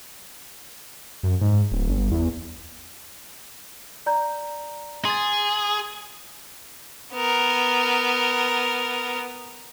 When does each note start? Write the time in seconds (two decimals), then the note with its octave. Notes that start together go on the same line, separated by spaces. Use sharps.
1.23 F#2
1.41 G#2
1.71 D1
1.89 G1
2.11 E2
4.06 D5 A#5 G6
5.05 G#4 C6 A6
7.14 B3 A#4